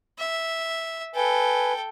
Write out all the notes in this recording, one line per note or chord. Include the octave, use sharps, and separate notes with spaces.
E5
A4 B4 G5 G#5